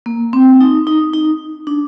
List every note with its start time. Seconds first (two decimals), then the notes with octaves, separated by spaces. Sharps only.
0.06 A#3
0.33 C4
0.60 D#4
0.87 D#4
1.14 D#4
1.67 D4